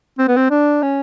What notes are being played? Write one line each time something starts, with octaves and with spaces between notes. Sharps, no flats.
C4
B3
C4
D4
C#4